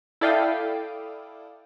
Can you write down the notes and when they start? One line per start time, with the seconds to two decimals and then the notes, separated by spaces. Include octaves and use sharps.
0.21 E4 A4 D5 F5 G5 D#6